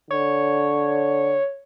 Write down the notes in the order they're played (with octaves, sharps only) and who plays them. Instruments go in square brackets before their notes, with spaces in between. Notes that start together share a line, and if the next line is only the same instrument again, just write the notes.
[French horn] D3 [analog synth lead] C#5